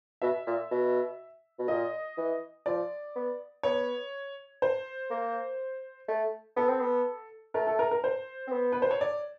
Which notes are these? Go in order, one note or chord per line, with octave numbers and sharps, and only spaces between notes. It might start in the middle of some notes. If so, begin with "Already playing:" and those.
B2 E5
A#2
B2
B2
A#2 D#5
E3
F3 D5
B3
B3 C#5
C5
A#3
A3
B3 A4
C4
B3
A3 A#4
A4
A#4
A#4
C5
C4
B3
B4
C5
C#5
D5